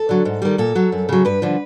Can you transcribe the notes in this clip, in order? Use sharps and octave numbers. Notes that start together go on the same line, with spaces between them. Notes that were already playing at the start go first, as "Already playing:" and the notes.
Already playing: A4
D3 F#3
G#2
D#3 G3
A#2 A4
F#3
F#2
C#3 F#3
G2 B4
D3 F3